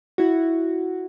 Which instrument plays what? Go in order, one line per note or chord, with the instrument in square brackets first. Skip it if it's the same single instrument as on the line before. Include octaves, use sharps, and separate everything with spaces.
[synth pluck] E4 F#4